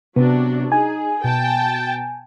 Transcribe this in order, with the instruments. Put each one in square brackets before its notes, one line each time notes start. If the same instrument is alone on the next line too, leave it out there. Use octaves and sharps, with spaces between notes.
[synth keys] C3 [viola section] F#3 D4 F#4 [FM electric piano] B3
[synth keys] D#4 [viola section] G#4 [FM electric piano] G#5
[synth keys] B2 [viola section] G5 A5